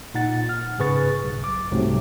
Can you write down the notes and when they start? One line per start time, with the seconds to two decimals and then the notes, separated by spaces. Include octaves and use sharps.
0.14 A#2 D#4 F#5 A6
0.49 F6
0.78 G#2 C#3 G#4 B4 C#6 A6
1.24 B1
1.44 D6
1.71 C2 G#2 C3 F#3 A3 C4